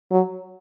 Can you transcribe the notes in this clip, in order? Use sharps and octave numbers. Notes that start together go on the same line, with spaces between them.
F#3